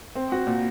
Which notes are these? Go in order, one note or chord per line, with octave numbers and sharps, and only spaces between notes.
C4
F#4
A#2